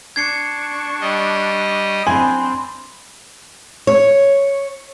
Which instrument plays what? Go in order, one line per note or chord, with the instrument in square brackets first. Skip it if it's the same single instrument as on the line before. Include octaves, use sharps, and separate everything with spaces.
[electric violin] D4 C#6 [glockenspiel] G#6 C7 C#7
[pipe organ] G3 D#5
[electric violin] C4 D4 [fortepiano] G#5 [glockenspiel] B5 C6
[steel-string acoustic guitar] C#5